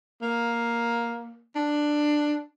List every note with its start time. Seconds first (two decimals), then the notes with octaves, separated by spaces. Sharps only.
0.22 A#3
1.55 D4